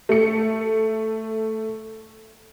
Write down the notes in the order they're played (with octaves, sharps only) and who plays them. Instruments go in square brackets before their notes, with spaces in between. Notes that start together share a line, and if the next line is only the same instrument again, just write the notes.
[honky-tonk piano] A3 C#7